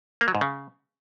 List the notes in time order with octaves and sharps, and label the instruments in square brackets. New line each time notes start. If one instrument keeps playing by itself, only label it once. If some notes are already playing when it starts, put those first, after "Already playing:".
[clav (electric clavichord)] A#3
F#3
G#2
C#3